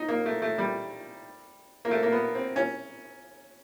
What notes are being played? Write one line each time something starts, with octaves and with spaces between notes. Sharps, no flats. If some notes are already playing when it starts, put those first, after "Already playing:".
Already playing: D#4
A#3
A3
A3
G3
A#3
A3
A#3
B3
C4
C#4